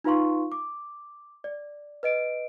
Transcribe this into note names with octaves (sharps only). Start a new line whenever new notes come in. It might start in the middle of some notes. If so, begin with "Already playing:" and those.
D#4 F4 B4 F5 C6 C#6
D6
D5
B4 D#5 D7